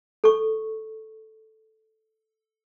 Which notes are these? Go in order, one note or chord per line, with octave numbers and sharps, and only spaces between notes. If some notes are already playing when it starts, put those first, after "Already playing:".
A4 C#6